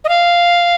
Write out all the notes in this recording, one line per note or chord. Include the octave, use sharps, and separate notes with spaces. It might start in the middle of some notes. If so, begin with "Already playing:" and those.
D#5
F5